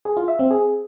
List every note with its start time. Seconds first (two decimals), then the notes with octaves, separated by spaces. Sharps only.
0.05 G#4
0.17 F4
0.28 E5
0.39 C4
0.51 G#4